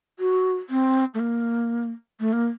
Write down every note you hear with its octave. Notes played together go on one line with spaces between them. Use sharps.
F#4
C4
A3
A#3
A3
A#3